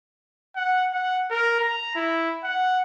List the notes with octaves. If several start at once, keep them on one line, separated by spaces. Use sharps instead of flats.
F#5
F#5
A#4
A#5
E4
F#5